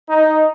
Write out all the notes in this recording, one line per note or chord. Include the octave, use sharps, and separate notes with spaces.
D#4